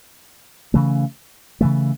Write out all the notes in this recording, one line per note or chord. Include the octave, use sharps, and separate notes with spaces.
C#3 E3 A3
C#3 E3 A3